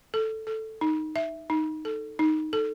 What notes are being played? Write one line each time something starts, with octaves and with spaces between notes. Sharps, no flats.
A4
A4
D#4
E5
D#4
A4
D#4
A4